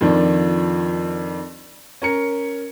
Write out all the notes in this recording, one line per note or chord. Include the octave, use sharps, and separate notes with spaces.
F2 D#3 F3 D4
C#4 A#4 C#7